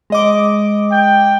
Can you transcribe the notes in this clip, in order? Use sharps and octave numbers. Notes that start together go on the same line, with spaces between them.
G#3 D#5 D6
G5